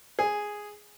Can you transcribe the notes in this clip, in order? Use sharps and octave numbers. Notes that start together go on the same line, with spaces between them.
G#4